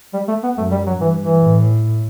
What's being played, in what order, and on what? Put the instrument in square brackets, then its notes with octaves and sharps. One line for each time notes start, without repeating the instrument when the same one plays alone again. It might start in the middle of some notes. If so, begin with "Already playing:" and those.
[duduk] G3
A3
B3
[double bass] F#2 [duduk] A3
[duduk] G3
F#3
[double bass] G2 [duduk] E3
[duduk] E3
[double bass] A2